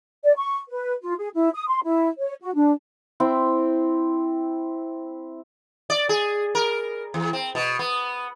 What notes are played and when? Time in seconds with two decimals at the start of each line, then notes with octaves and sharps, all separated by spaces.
0.24 D5
0.37 C#6
0.69 B4
1.03 F4
1.19 G#4
1.34 E4
1.54 D#6
1.68 C6
1.83 E4
2.18 C#5
2.41 F#4
2.54 D4
3.20 C4 E4 G5
5.90 D5
6.09 G#4
6.55 A#4
7.14 E2
7.33 C4
7.55 B2
7.79 B3